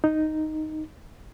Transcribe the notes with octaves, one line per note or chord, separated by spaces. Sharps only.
D#4